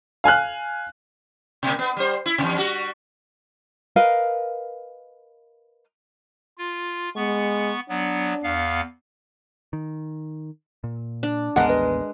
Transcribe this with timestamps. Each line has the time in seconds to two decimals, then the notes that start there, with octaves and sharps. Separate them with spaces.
0.24 F5 G#5 F6 F#6
1.63 B2 A#3
1.79 B3
1.96 G3 C5
2.26 E4
2.38 E2 G2 B2
2.58 G3 F#4
3.96 A#4 B4 D#5 F5
6.58 F4
7.16 G#3 B3 C#6
7.89 F#3 B3 D4
8.43 E2 B3 F5
9.73 D#3
10.84 A#2
11.23 D4
11.56 A1 D#2 G#3 B3 D4 A#4 B4 F#5
11.69 B4 D#5